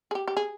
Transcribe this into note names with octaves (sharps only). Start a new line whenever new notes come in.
G#4
G4
G4
G#4